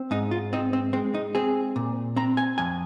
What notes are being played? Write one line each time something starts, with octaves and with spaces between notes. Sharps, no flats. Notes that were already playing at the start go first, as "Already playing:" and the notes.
Already playing: C4
G#2 D#4
F4
C4 D#4
C4
G#3 C4
D#4
C4 G#4
A#2
C4 A#5
G#5
F2 G#5